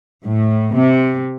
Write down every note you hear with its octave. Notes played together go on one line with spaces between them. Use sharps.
A2
C3